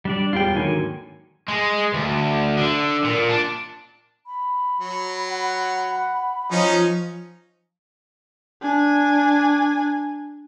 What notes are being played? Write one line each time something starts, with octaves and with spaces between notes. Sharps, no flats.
G3 D4 D5
E1 G3 F4 G5
G#2 D3 D#3 F#3 A#3 G#5
G#3
D2
D3
A#2
D4
B5
F#3
F#5
F3 C#4 D#4 F4 D#5
D4 G#5